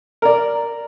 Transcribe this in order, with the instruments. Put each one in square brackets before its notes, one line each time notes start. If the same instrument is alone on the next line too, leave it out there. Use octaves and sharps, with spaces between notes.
[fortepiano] A#4 D5